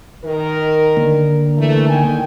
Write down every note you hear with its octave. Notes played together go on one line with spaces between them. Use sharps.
D#3 A#4
D3 A#3
E3 A3
D#3 G5 G#5